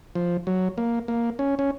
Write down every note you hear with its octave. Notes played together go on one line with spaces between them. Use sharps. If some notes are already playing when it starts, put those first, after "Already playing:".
F3
F#3
A#3
A#3
C#4
C#4